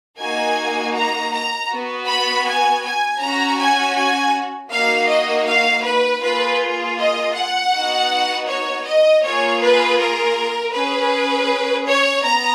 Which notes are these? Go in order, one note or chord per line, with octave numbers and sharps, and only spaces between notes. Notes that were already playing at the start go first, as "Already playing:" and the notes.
A#3 D#4 F#4 G#5
A#5
A#5
B3 F#4
B5
G#5
G#5
C#4 F#4 A#5
G#5
G#5
A#3 D#4 F#4 F5
D#5
F5
B4
A#3 F4 G#4 B4
D#5
F#5
B3 D#4 F#4
C#5
D#5
A#3 F4 G#4 C#5
B4
A#4
C#4 G#4 B4
C#5
B3 A#5